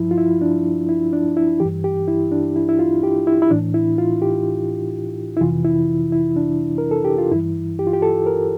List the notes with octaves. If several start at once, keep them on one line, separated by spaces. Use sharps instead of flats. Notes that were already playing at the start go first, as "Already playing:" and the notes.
Already playing: G2 F3 E4
F4
E4
D4
E4
D4
E4
G2 E3 G4
G4
E4
D4
E4
E4
F4
G4
E4
E4
A2 E3 D4
E4
F4
G4
E4
F2 C3 E3 F4
E4
E4
D4
A#4
A4
G4
F4
G2 E3 E4
G4
F4
G4
A4
A#4